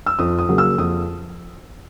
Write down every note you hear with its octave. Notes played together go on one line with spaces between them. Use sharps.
E6
F2 D#6
D#6
C#3 F#3 A#3
E6
F2 D#6